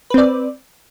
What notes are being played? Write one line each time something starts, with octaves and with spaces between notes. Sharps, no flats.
C4 B4 D5